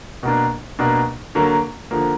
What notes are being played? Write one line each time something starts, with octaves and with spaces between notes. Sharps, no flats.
B2 A#3 D4
B2 A#3 D4
D3 F#3 A#3
D3 F3 A#3